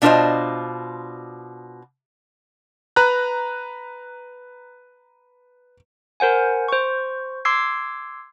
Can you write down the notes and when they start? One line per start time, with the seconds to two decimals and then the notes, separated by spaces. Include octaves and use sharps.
0.02 B2 D4 F4 B4 C5 D#5
2.96 B4 A#5 F#6
6.20 A#4 C5 F#5 G#5
6.68 C5 C#6
7.45 C6 D6 E6 G#6 C7